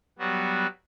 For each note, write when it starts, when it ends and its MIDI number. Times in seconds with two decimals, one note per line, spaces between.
0.19 0.67 54
0.19 0.67 55
0.19 0.67 59
0.19 0.67 66